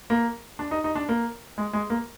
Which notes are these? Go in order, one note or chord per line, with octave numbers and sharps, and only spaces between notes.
A#3
D4
D#4
D#4
D4
A#3
G#3
G#3
A#3